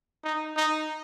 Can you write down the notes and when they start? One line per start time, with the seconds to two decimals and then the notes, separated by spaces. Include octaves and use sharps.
0.24 D#4
0.57 D#4